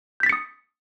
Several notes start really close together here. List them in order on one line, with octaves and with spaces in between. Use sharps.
G6 B6 A6 C#7 D#6